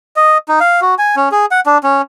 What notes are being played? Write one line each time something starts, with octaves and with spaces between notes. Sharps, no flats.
D#5
D#4
F5
F#4
G#5
C#4
G#4
F#5
D4
C#4